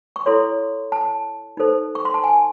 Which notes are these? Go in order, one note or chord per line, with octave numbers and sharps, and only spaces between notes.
C#6
E4 A4 C#5 C6
A5
D#4 A4 C5
C#6
C6
A5
G#5